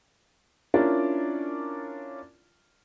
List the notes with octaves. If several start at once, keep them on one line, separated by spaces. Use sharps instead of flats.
C#4 D4 E4 F4 A#4 D5